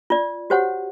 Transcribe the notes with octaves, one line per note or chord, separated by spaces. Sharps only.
F4 D5
F#4 G4 C5 C#5 F#5